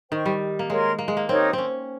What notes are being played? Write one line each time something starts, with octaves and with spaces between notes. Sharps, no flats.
D#3 C5 G5 C#6
G3
A#3
G#3 A#4 C#5 G#5 C6
A#3
G#3
A#3
C4 D#4 G4 A#4 C#5
C4 C#4